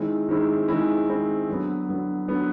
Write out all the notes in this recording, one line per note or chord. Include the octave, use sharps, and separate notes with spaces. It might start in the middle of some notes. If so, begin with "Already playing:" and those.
Already playing: D#3 G#3 C4 E4
D#3 G#3 C4 E4
D#3 G#3 C4 E4
D#3 G#3 C4 E4
D3 F#3 B3
D3 F#3 B3
D3 F#3 B3